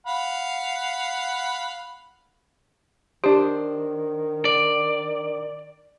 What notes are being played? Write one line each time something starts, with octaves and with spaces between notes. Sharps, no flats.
F5 F#5 B5
D#3 D4 G4 C5
D5